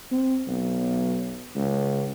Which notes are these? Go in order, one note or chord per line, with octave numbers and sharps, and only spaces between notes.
C4
B1
C#2